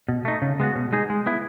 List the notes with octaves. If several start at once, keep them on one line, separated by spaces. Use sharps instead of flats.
B2
A3 D#4
C#3
G#3 B3 F#4
B2
G#3 D#4 G#4
G#3
B3 E4